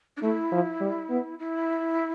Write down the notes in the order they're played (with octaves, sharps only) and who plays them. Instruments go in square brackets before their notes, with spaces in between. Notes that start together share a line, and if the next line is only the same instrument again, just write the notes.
[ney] D4
[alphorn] A3 [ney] E4
[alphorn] F3
G3
B3
[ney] E4